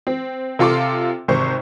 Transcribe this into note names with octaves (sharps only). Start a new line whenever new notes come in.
C4
C3 F4 A4 C6 D6
G#1 C3 C5 C#6